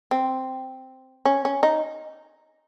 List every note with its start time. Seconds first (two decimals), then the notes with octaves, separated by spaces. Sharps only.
0.11 C4
1.25 C#4
1.45 C#4
1.63 D#4